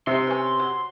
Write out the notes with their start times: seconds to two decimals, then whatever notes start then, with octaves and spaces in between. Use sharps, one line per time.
0.07 C3 D#4 E5 C6
0.27 C#4 B4
0.59 F#3